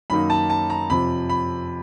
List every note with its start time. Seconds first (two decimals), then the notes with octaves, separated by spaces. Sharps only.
0.10 F#2 D#3 F#3 A#3 D#4 B5
0.30 A5
0.50 A5
0.70 A#5
0.90 F2 C3 F3 B5
1.29 B5